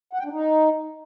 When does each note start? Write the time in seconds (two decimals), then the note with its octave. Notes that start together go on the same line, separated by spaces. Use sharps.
0.13 F#5
0.19 G5
0.25 D4
0.31 D#4